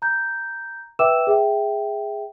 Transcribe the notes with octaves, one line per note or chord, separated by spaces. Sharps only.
A#5 G6
B4 E5 G5 D6 E6 E7
G#4 E5 G5